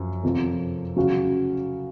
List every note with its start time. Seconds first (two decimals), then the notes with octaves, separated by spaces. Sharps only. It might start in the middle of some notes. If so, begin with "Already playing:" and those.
Already playing: F#2 F3
0.23 F2 C3 F3
0.96 C#3 F#3 C#4 F#4